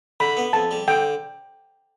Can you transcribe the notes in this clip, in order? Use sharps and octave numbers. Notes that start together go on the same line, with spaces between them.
D3 B5
B3
F2 A5
G3
D3 G5